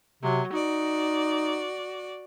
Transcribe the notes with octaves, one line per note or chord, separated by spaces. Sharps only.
C3 F#3
D#4 F#4 D5